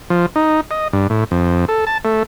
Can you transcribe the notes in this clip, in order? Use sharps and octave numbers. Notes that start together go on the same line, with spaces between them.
F3
D#4
D#5
G2
A2
F2
A4
A5
A3